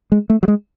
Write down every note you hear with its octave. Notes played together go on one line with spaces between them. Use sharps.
G#3
A3
F#3
G#3